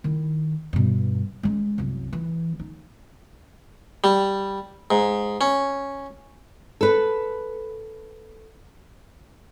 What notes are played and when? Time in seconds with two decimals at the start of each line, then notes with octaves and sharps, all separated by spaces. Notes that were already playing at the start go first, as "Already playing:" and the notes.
0.04 D#3 E4
0.73 G2 B2
1.43 G#3 C#4
1.78 C2 F#2
2.13 E3
2.60 D#4
4.04 G3
4.91 G#2
5.41 C#4
6.81 A4 B4